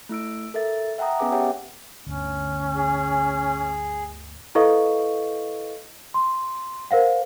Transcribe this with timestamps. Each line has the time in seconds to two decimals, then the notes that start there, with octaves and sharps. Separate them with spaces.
0.09 A3 E4 E6 D7
0.54 A4 A#4 E5 A6
0.98 E5 F#5 G5 A5 A#5 D#6
1.19 B3 C#4 G#4 B4 G#5 D6
1.32 G4 C#5 E5 F#5 G5 A5
2.06 G1 D2 C#4
2.76 G#4
4.55 E4 A4 B4 D#5 F5 C#6
6.14 C6
6.91 A#4 C5 F5 F#5